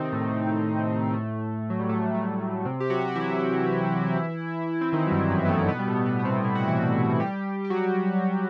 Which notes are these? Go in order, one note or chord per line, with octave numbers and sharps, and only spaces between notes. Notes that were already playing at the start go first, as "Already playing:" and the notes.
Already playing: C3 D#3 C4 D#4
A2 A3
A2 A3
F#3
G3
A2 A3
A2 A3
C3 C4
G4
F#3 F#4
G4
F#4
E3 E4
C4
D#3 D#4
F#3
G2 G3
F#2 F#3
B3
A2 A3
B2 B3
G3
A2 A3
B2 B3
B3
C3 C4
E4
F#4
E3 E4
G3 G4
G4
F#3 F#4